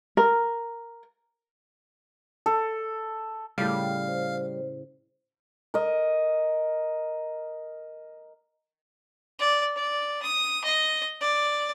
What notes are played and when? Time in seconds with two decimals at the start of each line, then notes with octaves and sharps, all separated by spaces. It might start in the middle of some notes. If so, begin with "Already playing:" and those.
0.17 A#4
2.46 A4
3.58 A2 C#3 G3 F5
4.08 C5
5.74 A#4 D#5
9.39 D5
9.76 D5
10.22 D#6
10.64 D#5
11.21 D5